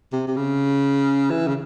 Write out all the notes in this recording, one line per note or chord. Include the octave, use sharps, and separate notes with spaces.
C3
C3
C#3
E3
C#3